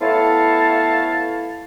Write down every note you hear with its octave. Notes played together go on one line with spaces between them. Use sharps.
A3 B3 E4 C#5 F5 A5